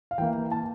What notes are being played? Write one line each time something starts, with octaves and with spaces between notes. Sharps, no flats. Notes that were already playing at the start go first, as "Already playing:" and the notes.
F5
E3 A#3 G5
A5